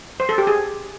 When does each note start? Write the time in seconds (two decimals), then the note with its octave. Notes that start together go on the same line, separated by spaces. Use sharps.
0.20 C5
0.29 A4
0.38 G4
0.47 G#4